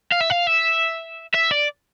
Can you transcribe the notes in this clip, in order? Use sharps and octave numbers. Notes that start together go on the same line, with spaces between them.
F5
E5
F5
E5
E5
D5